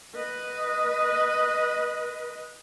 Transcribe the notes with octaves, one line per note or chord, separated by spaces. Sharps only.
B4 D#5